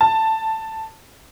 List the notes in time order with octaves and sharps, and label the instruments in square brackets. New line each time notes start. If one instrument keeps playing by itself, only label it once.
[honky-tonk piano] A5